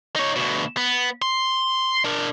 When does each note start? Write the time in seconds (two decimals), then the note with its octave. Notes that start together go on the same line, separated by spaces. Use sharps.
0.16 D#4 C#5
0.36 D2 B2
0.77 B3
1.22 C6
2.05 D4 A#4